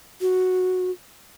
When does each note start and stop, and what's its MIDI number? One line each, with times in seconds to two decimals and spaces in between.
0.21 0.91 66